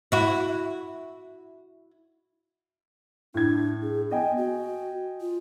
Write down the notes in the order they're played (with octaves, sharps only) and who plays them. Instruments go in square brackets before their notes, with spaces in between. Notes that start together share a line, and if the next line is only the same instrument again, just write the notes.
[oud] E4 F#4
[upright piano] A2 G#6 [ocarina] D4
[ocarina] G#4
[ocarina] B3 [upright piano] D#5 G5 G#5
[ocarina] F#4
F4